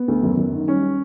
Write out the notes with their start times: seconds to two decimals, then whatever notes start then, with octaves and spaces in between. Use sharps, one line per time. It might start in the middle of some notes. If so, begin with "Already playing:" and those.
Already playing: B3
0.08 D2
0.23 F#2
0.37 F#2
0.53 D#3
0.67 G3 C#4